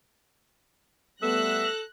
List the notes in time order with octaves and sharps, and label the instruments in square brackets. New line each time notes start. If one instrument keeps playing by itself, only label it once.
[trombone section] G3 A3 B3 [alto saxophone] A4 [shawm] E5 [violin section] F#6 A#6